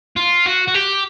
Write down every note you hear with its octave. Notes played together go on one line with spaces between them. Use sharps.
F4
F#4
F#4
G4